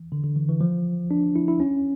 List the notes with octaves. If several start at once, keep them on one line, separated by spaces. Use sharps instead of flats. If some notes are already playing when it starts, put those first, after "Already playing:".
Already playing: E3
D3
D3
E3
E3
F3
D4
E4
E4
C#4